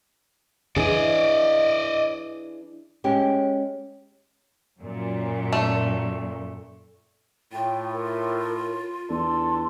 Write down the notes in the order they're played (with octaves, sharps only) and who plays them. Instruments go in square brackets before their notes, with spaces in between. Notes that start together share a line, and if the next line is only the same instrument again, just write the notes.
[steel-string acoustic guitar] E3 D4 G#4 [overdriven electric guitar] D5 D#5
[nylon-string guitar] G#3 C#4 G4
[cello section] F#2 A#2
[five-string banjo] A3
[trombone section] A2 [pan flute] F4 [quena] G5
[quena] A#4
[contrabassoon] E2 [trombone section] D4 A4 [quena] C6